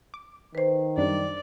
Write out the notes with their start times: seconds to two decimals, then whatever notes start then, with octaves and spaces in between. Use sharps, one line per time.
0.14 D6
0.55 D#3 B4 C5
0.97 F#2 G3 D4 D5